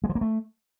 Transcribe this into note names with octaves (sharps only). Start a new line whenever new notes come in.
G#3
F3
A#3
A3